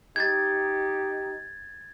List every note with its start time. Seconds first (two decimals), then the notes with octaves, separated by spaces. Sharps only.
0.16 D#4 G4 G#6 A6